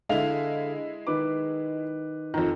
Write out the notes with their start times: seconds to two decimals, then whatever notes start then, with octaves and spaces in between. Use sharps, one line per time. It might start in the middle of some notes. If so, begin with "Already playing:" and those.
0.09 D3 G#3 E4 F5 F7
1.07 D#3 B4 D6
2.34 F2 D#3 A#5